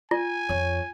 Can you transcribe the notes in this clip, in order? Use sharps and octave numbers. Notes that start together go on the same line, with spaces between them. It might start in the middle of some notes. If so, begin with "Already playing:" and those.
F4 G#5
F2 C#5